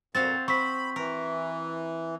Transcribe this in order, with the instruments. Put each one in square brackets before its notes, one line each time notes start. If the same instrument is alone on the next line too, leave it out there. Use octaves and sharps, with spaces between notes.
[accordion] F2 A#2 [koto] C4 F#4 F5 [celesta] A6
[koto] C4 [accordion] B5 [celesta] C#6 B6
[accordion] E3 [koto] A#4